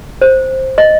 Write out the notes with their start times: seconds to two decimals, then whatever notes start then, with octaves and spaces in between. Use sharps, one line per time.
0.22 C5
0.78 D#5